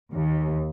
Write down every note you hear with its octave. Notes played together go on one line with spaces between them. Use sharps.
D#2